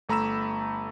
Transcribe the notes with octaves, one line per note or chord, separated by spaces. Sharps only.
G1 A3 A#5 B5 E6 E7